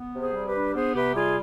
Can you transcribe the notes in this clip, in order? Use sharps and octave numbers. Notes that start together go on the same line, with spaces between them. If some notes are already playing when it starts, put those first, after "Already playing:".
Already playing: B3
C3
G#4 C5
G3
G4 B4
D4
B3 G#4 C5
C3 G4 B4
G3 F4 G#4